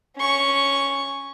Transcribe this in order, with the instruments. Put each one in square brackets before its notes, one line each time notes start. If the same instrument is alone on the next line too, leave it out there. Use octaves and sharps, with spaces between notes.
[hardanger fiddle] C#4 C#6